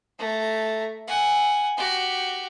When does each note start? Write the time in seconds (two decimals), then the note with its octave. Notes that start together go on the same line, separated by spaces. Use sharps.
0.18 A3 A#5
1.07 F#5 G#5
1.77 F#4 G4